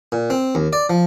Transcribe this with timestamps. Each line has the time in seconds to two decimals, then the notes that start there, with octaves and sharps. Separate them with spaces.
0.12 A#2
0.30 C4
0.55 D#2
0.73 D5
0.90 F3